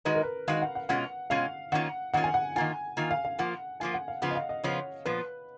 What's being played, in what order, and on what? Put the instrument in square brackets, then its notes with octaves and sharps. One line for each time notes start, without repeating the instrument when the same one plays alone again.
[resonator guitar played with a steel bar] D#3 G#3 D#4 F#4 [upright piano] B4
[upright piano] A#4
B4
[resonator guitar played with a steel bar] D#3 G#3 D#4 F#4 [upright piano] F5
[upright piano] F#5
F#5
[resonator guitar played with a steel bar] B2 G#3 C#4 F4 [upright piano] F#5
[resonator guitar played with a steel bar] B2 G#3 C#4 F4 [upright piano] F5
[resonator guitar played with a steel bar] D#3 A#3 C#4 F4 [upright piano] F#5
[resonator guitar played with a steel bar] D#3 A#3 C#4 F4 [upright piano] F#5
[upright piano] G#5
F#5
[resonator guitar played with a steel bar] D#3 A#3 F4 [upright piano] G#5
[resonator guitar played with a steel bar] D#3 A#3 F4
[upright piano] F5
F5
[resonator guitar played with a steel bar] F3 A#3 F4 [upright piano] F#5
[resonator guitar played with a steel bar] F3 A#3 F4 [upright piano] G#5
[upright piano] F#5
F5
[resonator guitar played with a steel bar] C#3 F3 B3 F4 [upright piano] F#5
[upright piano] D#5
F5
D#5
[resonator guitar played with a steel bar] C#3 F3 B3 F4 [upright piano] C#5
[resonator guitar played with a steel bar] A#2 F3 B3 F4 [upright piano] B4